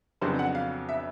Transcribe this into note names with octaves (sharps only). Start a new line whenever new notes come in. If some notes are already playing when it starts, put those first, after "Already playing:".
F2 C#3 F#3 B3 D4 C5
F#5
F5
E5